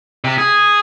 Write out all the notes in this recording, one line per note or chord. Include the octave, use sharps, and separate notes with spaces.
C3
G#4